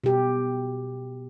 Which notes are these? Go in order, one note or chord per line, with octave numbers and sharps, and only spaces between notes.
B2 G4